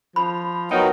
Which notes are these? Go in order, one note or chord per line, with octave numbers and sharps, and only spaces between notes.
F3 B5
F#3 B3 D#4 F#4 A#4 G5